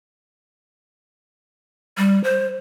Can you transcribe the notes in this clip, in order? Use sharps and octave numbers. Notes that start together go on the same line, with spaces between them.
G3
C5